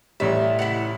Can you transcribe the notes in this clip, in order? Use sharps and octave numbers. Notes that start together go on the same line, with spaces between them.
A1 G3 E5
E4 F#5